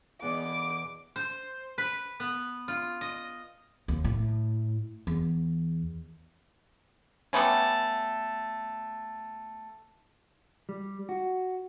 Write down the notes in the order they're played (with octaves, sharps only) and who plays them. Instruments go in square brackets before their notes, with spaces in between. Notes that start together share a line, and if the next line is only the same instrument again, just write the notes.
[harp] E2 B2 E3 [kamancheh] D6
[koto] C5
B4
B3
F4
D#5
[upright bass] D#2
A2
E2
[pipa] G3 A3 B3 C#4
[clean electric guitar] G3
F#4